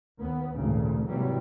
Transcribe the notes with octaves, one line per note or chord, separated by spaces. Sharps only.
D#2 B3
G#1 D2 A#2 C#3
G#1 C3 E3 F#3 G3 A#3